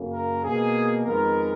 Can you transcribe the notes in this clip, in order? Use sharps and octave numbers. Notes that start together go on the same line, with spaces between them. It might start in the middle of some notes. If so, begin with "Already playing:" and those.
Already playing: F#2 C#3 F#3 A#3
A#4
B2 A#3 G#4
F2 D#3 G#3 B3 A#4